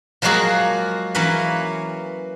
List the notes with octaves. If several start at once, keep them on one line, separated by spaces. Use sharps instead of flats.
F3 F#3 G#3 A#3 F#4 G#4
E3 F#3 A#3 C#4 B4